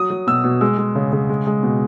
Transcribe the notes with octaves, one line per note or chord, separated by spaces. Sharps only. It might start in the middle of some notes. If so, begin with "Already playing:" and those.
Already playing: F#3 D#6
F#3
B2 E6
B2
G#3 E6
G#3
C#3
C#3
G#3
G#3
B2